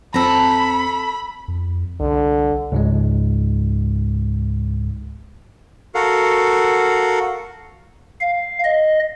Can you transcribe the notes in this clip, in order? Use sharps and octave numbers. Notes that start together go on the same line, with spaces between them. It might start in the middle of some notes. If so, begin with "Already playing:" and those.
F2 C4 A4 A#5 B5
F2
C2 D3
C#2 G#2 G#3
F#4 A4 A#4 F5 F#5
F5
D#5